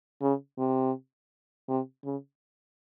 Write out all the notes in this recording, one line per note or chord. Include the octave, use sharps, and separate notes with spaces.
C#3
C3
C3
C#3